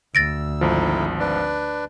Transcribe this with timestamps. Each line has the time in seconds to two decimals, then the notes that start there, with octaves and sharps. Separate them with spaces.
0.15 D2 E6 A6 A#6 D7
0.61 G#1 F3 D#4 E4 A4
1.20 D4 B4 D5